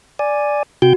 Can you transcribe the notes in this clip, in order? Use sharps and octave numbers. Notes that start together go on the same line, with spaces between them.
D5 G#5
C3 F#4 G5 G6